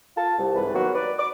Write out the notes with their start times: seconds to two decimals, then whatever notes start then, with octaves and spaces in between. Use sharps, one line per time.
0.17 F4 A5
0.39 C2
0.55 C2 G#2 E3 B4
0.74 D#3 F#3 A#3 B3 F#4
0.95 B4 D5
1.18 D6